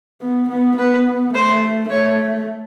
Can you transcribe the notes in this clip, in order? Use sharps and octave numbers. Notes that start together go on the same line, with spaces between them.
B3
B3
B3 B4
A3 C5
A3 C#5